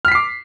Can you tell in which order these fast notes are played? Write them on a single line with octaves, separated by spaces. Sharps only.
F6 B6 C7 D6